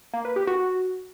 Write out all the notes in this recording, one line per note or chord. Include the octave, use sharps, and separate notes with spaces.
A#3
B4
G4
F#4